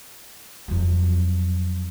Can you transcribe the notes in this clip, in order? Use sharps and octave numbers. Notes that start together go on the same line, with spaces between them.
F2 F#3